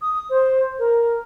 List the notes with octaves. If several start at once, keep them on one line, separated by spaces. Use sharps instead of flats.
D#6
C5
A#4